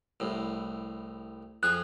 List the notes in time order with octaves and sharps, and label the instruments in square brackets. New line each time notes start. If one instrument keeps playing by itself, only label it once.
[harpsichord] C2 A2
[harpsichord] F2 F3 G#4 [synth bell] F#6